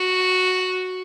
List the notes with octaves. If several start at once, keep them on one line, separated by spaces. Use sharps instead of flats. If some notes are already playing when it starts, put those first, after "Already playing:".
Already playing: F#4